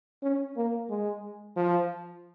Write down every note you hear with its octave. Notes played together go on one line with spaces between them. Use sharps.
C#4
A#3
G#3
F3